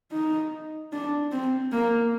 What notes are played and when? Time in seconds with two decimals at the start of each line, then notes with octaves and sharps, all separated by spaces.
0.12 D#4
0.93 D4
1.32 C4
1.73 A#3